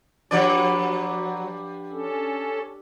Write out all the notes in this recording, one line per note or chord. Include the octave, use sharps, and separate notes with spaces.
F3 F#3 D4 G4 B4 D5
C#4 A4